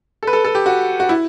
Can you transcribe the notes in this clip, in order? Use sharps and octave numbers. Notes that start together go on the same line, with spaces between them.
A4
B4
A4
A4
G4
F#4
F#4
E4